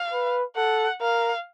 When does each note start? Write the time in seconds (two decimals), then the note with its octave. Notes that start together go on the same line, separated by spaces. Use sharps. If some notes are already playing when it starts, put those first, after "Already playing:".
Already playing: F5
0.12 B4
0.56 A4 F#5
1.01 A#4 F5